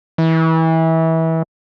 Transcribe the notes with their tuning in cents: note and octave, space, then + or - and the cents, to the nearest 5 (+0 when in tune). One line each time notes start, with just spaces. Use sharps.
E3 -25